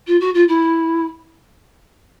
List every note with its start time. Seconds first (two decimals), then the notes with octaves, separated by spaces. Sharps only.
0.07 F4
0.20 F#4
0.34 F4
0.48 E4